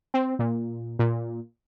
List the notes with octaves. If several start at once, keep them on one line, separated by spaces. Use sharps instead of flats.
C4
A#2
A#2